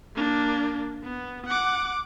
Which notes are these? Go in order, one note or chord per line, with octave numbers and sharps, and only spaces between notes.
A#3 D4
B3
F#5 D6